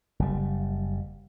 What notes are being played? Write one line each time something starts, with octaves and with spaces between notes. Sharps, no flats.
F#1 G3